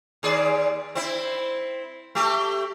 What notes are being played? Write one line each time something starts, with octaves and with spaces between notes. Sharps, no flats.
D#2 G#4 D5
C4 E4
A3 G4